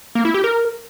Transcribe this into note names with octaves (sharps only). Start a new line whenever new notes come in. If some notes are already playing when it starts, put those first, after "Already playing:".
A#3
E4
G4
A#4